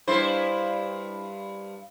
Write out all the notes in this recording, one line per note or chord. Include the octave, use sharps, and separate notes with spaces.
G2 E4 C5